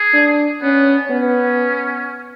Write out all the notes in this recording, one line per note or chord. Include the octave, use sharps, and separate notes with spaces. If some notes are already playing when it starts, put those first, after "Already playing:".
Already playing: G#4
D4
B3 C#4
B3 C#4